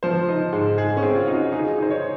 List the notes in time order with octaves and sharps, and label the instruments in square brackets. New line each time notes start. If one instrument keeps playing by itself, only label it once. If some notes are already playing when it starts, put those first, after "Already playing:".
[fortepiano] F3 [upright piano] C5
[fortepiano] D#4
G#2
[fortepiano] G#2 [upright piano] G#4
[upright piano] C#4
[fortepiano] C4
[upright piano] F4
[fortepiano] D#4
[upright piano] F#4
[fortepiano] D#4 [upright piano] G#4
[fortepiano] D#4 [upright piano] C5
[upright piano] C#5